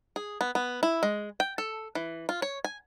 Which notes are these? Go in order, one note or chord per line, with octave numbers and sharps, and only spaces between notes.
G#4
B3
B3
E4
G#3
G5
A4
E3
F4
C#5
G#5